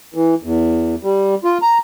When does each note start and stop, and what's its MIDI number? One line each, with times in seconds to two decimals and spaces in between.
0.14 0.34 52
0.43 0.95 40
1.03 1.35 55
1.44 1.58 65
1.62 1.78 82